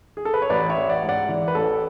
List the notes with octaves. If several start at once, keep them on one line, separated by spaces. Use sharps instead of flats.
G#4
A4
B4
C#5
A1 B4 D5
C#5 E5
A1
D5 F#5
G#2
D5 F#5
E3
B4
A1 A4